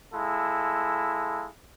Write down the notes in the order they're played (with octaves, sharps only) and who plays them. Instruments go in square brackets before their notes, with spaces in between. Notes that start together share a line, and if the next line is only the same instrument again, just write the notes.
[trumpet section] G#3 E4 F4 A4